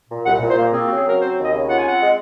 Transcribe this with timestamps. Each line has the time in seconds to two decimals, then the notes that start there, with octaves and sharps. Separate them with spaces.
0.10 A#2
0.25 C2 F#5
0.41 A#2
0.49 C5
0.57 A#3
0.73 C4 G#4
0.79 F4
0.85 F#4
0.89 C#3
0.96 G#4
1.05 F#3 A#4
1.20 C4 C5
1.36 D#2
1.44 D#5
1.53 C#3
1.68 F4 F#5
1.78 G#5
1.84 C4 F#5
2.00 G#3